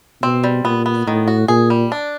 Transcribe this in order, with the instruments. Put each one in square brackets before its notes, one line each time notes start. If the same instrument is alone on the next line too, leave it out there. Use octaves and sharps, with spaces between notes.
[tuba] B2 [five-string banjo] C4
[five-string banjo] G3
[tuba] A#2 [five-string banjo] B3
[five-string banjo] B3
[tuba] A2 [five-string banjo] D#3
[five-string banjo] F#4
[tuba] A#2 [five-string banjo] G#4
[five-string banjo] G3
D4